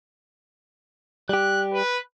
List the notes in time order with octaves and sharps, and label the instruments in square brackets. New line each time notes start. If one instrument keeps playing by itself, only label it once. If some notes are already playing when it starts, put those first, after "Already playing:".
[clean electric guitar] G3 G4 [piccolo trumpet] F#6
[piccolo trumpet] B4